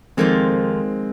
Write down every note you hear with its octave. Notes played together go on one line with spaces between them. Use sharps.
F2 D#3 G#3 A#3 C4 F4